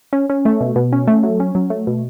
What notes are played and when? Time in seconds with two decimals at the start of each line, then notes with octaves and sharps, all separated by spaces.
0.13 C#4
0.30 C#4
0.45 A3
0.61 B2
0.76 B2
0.93 C#4
1.07 A3
1.23 F#3
1.40 C#4
1.55 F#3
1.70 A3
1.87 B2